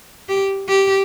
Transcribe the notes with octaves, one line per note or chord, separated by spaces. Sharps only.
G4
G4